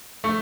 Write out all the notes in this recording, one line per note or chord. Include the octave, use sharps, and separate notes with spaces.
A3